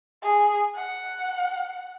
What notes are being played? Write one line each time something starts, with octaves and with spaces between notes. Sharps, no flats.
G#4
F#5